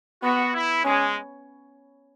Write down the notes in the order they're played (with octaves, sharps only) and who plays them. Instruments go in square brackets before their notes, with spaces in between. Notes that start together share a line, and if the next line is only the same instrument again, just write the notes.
[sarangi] B3 [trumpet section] F#4
[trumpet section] E4
[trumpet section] G#3 [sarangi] C#4